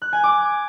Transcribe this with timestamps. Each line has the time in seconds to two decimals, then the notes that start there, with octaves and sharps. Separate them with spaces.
0.02 F#6
0.13 G#5
0.23 D6